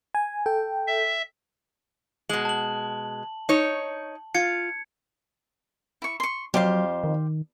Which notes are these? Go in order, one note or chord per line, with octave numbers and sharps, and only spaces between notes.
G#5
A4 G5
E5
B2 G#3 F#7
A5 F#7
D#4 C#5
F4 G#6 C#7
E4 C#6
C6 C#6
F2 F#3 G4 C5 F5
D#3